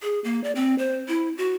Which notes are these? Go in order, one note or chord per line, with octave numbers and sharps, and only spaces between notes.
G#4
A#3
D5
C4
C5
E4
F#4